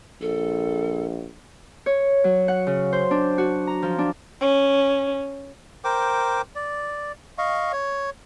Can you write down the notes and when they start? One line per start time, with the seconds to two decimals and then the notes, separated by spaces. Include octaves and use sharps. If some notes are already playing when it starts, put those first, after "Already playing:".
0.21 A#1 A4
1.86 C#5
2.24 F#3
2.48 F#5
2.67 C#3
2.93 C5
3.11 D4
3.38 F#4
3.67 A#5
3.83 F3
3.98 D4
4.41 C#4
5.84 A#4 C5 G5 D6
6.55 D5
7.38 D#5 F5 C#6
7.73 C#5